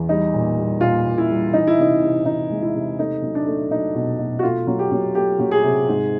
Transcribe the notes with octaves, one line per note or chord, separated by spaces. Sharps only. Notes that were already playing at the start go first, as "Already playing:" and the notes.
Already playing: E2
G3 D#4
A#2
G3
A#2 F4
A#2
E4
G3
E3 D#4
E4
C3 D#4
C3
E3 D#4
G#3
E4
C3
A3 D#4
F#3
D4
A3
F#3 D#4
B2
B2
F#4
A3 F4
F#3
G4
F#3
A3 G4
F#3
G#4
C3
G#2